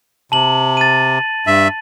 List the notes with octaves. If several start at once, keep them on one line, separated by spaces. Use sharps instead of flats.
C3 A5 F#7
A6 D#7
G2 E5